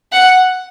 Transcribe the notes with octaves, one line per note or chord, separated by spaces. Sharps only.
F#5